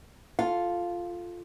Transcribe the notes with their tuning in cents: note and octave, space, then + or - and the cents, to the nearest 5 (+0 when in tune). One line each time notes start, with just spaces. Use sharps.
F4 +0 A4 -5 F5 +0